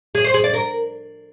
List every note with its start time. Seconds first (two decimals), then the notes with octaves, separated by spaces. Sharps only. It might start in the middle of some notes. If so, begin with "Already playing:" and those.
0.15 G#4
0.24 C5
0.34 G#4
0.44 D5
0.54 A#4